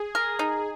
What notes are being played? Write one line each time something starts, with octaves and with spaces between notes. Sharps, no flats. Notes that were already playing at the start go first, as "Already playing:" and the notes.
Already playing: G#4
A#4
D#4